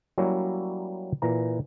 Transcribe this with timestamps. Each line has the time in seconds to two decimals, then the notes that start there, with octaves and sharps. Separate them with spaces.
0.18 F#3 G3 A#3 C#4 E4
1.22 A#2 E3 A#5